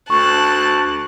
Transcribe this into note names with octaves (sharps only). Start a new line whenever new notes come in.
D2 A5 C#6 F#6